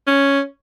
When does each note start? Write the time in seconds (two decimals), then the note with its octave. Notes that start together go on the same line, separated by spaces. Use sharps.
0.07 C#4